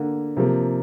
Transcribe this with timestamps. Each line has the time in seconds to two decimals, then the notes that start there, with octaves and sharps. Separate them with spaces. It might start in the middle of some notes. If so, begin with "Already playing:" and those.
Already playing: D3 A#3
0.37 C3 F3 A#3